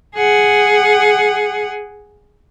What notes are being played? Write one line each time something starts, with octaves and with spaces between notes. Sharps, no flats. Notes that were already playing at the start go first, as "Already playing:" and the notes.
G#4 F#5